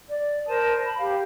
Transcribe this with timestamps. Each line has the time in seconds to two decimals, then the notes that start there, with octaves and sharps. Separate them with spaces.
0.09 D5
0.48 A#4 C5 A5 D#6
0.85 B5
0.99 G4 F5